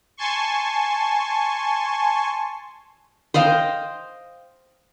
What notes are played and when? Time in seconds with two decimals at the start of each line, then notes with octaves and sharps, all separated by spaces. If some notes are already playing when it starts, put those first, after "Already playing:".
0.17 G#5 A5 C6 C#6
3.34 C5 D#5 F5 G5